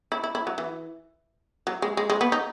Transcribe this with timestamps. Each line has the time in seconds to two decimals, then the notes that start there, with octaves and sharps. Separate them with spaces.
0.12 E4
0.24 E4
0.35 E4
0.47 F#3
0.58 E3
1.67 F#3
1.82 G#3
1.97 G#3
2.10 G#3
2.21 B3
2.32 D#4